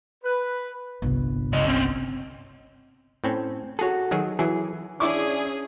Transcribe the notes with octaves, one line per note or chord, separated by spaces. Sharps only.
B4
G1 C2
C#3 D#5
C4 C#4
A2 C4 C#4
F#4 G#4 A4 C#5
D#3 F#3 G#4
E3 F#3 E4 G#4
C#4 D4 E4 G#4 C#6 D6